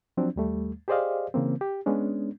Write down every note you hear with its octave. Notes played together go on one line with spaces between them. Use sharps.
F3 F#3 C4 D4
D#2 G3 A3
G4 G#4 C5 D5 D#5 F5
C#3 E3 A#3 C4
G4
G#3 B3 C#4 D4